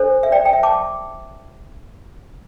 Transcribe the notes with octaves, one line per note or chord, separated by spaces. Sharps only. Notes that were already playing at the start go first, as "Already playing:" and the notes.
Already playing: D4 A4 C5
E5
D5 G5
G5
E5
A5 D6